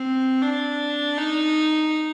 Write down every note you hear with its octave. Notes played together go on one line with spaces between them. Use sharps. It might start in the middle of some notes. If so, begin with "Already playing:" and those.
Already playing: C4
D4
D#4